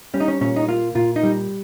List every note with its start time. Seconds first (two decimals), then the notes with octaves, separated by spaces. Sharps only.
0.14 G3 C#4
0.20 D#4
0.28 C#4
0.41 A#2 C#4
0.56 D#4
0.68 A#3 F4
0.95 A#2 F4
1.16 D#4
1.23 G3